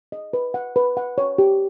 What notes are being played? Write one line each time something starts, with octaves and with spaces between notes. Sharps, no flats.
D#5
B4
F#5
B4
F#5
C#5
G4